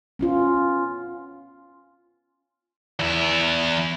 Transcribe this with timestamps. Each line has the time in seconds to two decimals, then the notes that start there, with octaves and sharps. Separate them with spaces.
0.19 B3 C#4 F4
2.99 E2 E4